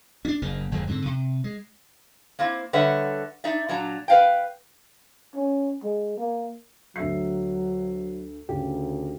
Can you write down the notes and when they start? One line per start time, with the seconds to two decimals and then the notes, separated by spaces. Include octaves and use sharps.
0.25 C#4 D4
0.42 F#1 C#3 A#3
0.72 F#1 F2 D3 G#3
0.87 G#2 D3 A#3 C4
1.06 C3
1.44 G#3
2.39 A#3 C4 E4
2.73 D3 G3 B4 C#5 E5 F#5
3.44 D#4 D5 E5
3.69 A#2 F#3 D4 A#5
4.08 B4 F5 G5
5.35 C#4
5.83 G#3
6.18 A#3
6.96 D2 F#3 E5 C7
8.49 D2 C#3 G4